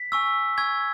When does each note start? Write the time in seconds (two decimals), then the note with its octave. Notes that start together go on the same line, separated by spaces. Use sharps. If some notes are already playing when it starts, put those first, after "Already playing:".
Already playing: B6
0.12 G#5 C#6 E6
0.58 G#5 C#6 E6 G#6